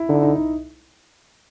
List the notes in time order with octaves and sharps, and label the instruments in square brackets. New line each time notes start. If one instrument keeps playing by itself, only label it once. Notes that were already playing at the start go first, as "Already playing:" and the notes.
Already playing: [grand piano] E4
[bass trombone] D3 [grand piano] D#4
[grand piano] D#4
D#4